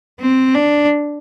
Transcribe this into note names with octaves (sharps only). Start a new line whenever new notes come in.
C4
D4